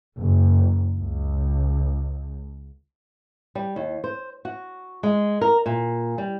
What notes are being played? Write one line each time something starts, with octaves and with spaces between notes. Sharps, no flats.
F#1
C#2
G3
D#2
C5
F#4
G#3
A#4
A#2
G3